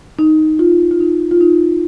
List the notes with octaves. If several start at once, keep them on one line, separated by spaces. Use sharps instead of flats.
D#4
F4
F4
D#4
F4
D#4